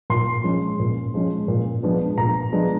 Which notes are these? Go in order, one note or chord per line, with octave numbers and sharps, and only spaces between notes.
A#2 C6
F3 G#3 C#4
A#2
F3 G#3 C#4
A#2
F3 G#3 B3 D4
A#2 A#5
F3 G#3 B3 D4